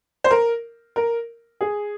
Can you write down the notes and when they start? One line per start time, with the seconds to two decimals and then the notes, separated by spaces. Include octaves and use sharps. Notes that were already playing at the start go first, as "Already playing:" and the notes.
0.24 C5
0.31 A#4
0.96 A#4
1.61 G#4